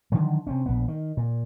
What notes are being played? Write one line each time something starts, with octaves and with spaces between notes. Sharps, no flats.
D3 D#3 F3 F#3
C3 C4 C#4
A#1 B3
D#3
A#2